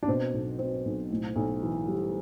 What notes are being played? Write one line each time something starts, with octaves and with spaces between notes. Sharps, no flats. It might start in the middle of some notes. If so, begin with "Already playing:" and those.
D4
B2 C4
B1
F#3 C4
B1
A2
B1
E3
G3